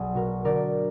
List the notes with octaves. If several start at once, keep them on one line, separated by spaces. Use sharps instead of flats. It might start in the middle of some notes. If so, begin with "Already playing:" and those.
Already playing: B1 F#3 G#4 D5
B2 F#4 A#4
D3 A#4 D5